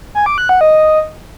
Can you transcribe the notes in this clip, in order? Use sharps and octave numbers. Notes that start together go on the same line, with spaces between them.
G#5
D6
F#6
F#5
D#5